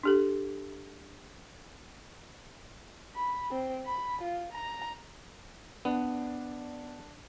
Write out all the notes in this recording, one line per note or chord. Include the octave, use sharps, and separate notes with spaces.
D4 G4 A4
B5
C4
B5
F4
A#5
B3 D4 D5